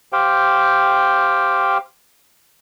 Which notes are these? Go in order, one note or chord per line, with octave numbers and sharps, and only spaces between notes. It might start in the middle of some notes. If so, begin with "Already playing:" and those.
G4 C5 F5 G5